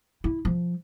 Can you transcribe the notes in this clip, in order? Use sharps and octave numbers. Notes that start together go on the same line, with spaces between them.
E4
F3